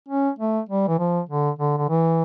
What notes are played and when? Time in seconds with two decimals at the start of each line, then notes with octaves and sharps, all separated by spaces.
0.09 C#4
0.39 A3
0.69 G3
0.88 E3
0.99 F3
1.29 D3
1.59 D3
1.78 D3
1.89 E3